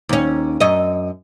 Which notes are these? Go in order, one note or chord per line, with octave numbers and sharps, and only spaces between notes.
D#2 C#4
F#2 D#5